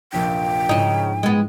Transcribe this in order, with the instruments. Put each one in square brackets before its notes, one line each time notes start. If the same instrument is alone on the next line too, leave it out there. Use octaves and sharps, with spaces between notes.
[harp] F1 A#1 D4 [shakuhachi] G5
[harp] G#2 E4 [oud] C#3 D#4
[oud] G#3 B3